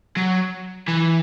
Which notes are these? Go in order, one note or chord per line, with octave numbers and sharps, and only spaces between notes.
F#3
E3